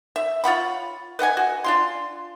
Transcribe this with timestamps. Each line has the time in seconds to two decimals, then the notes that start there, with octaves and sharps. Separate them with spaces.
0.16 E5
0.44 F4 C#5 F#5 B5
1.19 B4 D#5 F#5 G#5
1.37 F#4
1.64 D4 F4 C6